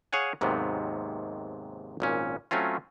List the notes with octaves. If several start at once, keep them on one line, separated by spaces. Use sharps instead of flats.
G#4 C#5 F5 F#5 G#5
D#2 G#2 C3 D#3 F#3 B3
G#1 A#2 C#4
F#3 A3 C4 C#4 F4